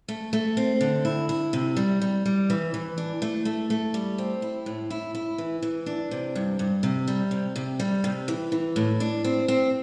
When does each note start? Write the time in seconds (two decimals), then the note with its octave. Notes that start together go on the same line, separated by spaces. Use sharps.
0.08 A3
0.33 A3
0.57 C4
0.81 D3
1.05 E4
1.29 E4
1.53 C3
1.77 G3
2.02 G3
2.26 G3
2.50 E3
2.74 E3
2.98 D4
3.22 A3
3.45 A3
3.70 A3
3.94 G3
4.18 C4
4.42 E4
4.66 A2
4.90 E4
5.15 E4
5.38 E3
5.62 E3
5.86 D4
6.11 C3
6.36 G2
6.59 G2
6.83 C3
7.07 G3
7.31 C3
7.56 C3
7.80 G3
8.04 C3
8.28 E3
8.52 E3
8.76 A2
9.00 D4
9.24 C4
9.48 C4